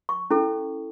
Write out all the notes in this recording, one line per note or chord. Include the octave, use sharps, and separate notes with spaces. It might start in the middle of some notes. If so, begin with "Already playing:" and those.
C#6
C#4 E4 A4